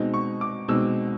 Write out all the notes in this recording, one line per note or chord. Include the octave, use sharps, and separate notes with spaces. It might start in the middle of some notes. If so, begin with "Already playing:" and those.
Already playing: B2 G#3 C4 D#4
C#6
D6
B2 G#3 C4 D#4 E6